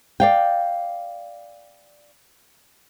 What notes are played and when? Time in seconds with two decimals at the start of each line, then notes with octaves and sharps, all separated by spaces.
0.20 D5 F5 G5